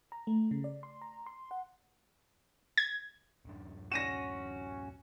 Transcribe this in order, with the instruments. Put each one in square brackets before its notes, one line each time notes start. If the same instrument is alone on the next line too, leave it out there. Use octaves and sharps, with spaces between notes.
[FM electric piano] A#5
A3
C#3
D5
C6
A#5
C6
F#5
[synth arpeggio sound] G#6
[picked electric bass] D1 F#2 D4
[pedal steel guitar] C#4 F#4 [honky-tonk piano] A#6 D#7 E7